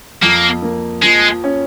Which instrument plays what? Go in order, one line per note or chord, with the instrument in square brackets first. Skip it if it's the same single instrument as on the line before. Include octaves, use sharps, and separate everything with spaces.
[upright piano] F2 [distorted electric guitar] A#3
[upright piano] A#3
[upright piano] F3 [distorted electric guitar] G#3
[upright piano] C#4